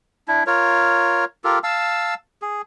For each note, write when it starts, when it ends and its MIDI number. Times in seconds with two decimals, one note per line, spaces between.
0.28 0.44 62
0.28 0.44 64
0.47 1.25 65
0.47 1.25 70
0.47 1.25 73
1.44 1.59 65
1.44 1.59 67
1.44 1.59 69
1.44 1.59 70
1.64 2.14 77
1.64 2.14 81
1.64 2.14 88
2.42 2.62 68